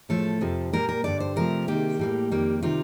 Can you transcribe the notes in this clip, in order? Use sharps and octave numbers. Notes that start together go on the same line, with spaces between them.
A2 F3 A3 A4
F2 C3 F3
A#2 G3 A#3 A#4
A#4
G2 D3 G3 D5
C5
C3 F3 A3 A#4
C3 D#3 A#3 G4
A2 G3 A#3
F2 D#3 G3 A#3
C3 D#3 G3 F4